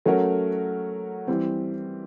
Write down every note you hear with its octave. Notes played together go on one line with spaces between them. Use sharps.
F#3 A3 C#4 F#4 A#4
E3 G3 C4